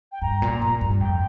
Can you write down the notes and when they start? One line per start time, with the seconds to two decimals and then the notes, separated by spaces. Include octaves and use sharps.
0.12 G5
0.22 G2 A#5
0.42 A#2
0.62 A#2
0.81 G2
1.00 F2 G5